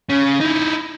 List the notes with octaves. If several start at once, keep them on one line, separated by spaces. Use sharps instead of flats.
C#3
D#4 E4